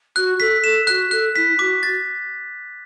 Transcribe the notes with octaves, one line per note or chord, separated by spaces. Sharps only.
F#4 F#6
A4 B6
A4 E7
F#4 F#6
A4 F#6
E4 B6
F#4 D6
A6